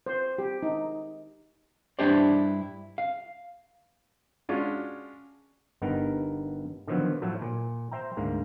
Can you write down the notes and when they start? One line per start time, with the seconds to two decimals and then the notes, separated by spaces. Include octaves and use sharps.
0.06 C5
0.38 G4
0.63 D#4
1.99 G2 D4 E4 G4 C5 D5
2.98 F5
4.49 G#3 C#4 D4 F4 F#4
5.81 G1 G2 B3 D#4 A#4
6.87 D3 D#3 F3 F#3 B3
7.22 A2 F3 F#3 A3
7.42 A#2
7.91 C5 E5 G5 A#5
8.17 D2 G#2 A#3